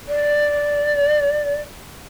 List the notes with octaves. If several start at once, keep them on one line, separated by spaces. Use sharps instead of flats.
D5